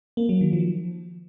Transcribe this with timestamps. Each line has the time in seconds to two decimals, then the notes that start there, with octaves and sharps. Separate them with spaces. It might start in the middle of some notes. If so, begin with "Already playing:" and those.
0.17 A#3
0.29 F#3
0.41 D#3
0.53 F3